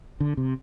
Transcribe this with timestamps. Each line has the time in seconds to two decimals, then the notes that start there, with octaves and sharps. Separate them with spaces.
0.20 D3
0.37 C3